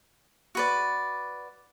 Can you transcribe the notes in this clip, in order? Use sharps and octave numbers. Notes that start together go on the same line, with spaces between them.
F#4 B4 D5